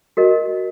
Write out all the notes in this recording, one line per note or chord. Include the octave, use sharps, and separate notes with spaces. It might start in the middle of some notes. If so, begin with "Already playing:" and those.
F#4 A#4 D#5